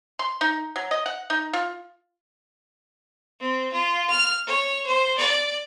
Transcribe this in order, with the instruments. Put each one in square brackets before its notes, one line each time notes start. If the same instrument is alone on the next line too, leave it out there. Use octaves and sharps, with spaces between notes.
[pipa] C6
D#4
F#3
D#5
F#5
D#4
F4
[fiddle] C4
F4
F6
C#5
C5
D5